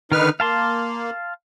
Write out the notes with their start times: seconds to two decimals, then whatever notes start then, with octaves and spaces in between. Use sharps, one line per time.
0.12 D3 D#3 D#4 B4 F6
0.40 A#3 F5 A5 C6